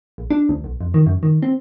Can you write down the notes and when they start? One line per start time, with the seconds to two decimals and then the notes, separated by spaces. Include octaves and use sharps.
0.18 A#1
0.30 D4
0.49 D2
0.64 B1
0.81 F2
0.94 D#3
1.06 F#2
1.23 D#3
1.42 C4